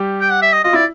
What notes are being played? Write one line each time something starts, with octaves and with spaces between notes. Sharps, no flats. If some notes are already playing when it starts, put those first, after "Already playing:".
Already playing: G3 G4
G5
F#5
E5
D#5
F4 D#5
E4 D5